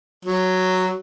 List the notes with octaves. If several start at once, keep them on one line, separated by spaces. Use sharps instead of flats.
F#3